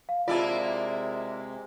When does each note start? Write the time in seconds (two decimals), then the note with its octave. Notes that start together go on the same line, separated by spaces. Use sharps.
0.09 F5
0.28 C3 G#3 A#3 E4 F4 D5 A5